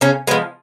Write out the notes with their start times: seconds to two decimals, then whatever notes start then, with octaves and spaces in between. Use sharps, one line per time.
0.01 C#3 C#4
0.27 G#3 B3
0.31 F3